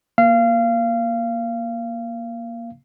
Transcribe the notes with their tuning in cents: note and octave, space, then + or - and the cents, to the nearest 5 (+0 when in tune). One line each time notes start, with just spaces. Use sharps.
A#3 +15 F5 -25